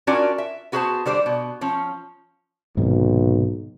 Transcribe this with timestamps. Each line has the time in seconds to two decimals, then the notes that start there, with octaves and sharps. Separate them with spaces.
0.07 C#4 D4 F4 F#4 A#4 D5
0.38 E5
0.72 B3 F#4 G#4 B4 C5 A5
1.06 D3 G3 C5 D5
1.26 B2
1.61 F3 C#4
2.77 B1 G#2 C3 D#3